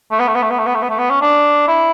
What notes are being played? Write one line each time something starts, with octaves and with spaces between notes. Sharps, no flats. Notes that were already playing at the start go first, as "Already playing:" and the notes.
A3
B3
A3
B3
A3
B3
A3
B3
A3
B3
A3
B3
C#4
D4
E4